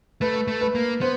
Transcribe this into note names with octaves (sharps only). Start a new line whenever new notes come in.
A3 B4
A3
B4
A#3
B3 C5